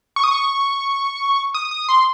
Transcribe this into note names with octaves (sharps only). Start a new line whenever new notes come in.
C#6
D#6
C#6
D#6
D#6
C6